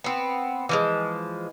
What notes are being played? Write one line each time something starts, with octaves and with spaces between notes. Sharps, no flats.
B3 C4
E3 F3 G#3